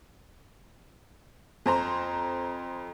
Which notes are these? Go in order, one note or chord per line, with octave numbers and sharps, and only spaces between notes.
F2 C5 A#5 C6